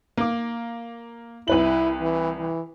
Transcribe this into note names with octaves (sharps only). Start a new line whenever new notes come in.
A#3 D6
C2 E4 B4 F#7
E3
E3